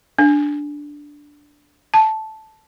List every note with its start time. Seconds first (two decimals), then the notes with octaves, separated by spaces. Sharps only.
0.19 D4
1.94 A5